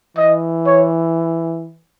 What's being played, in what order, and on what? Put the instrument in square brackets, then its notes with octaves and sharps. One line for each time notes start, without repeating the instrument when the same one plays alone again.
[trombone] E3 [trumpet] D#5
[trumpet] C#5